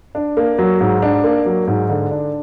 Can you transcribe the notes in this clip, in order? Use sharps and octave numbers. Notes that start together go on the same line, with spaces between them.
D4
A#3
F#3
G#2
D4
A#3
F#3
G#2
D3
D4